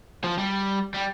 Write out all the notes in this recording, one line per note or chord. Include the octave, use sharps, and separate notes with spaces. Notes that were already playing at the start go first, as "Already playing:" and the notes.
F3
G3
G3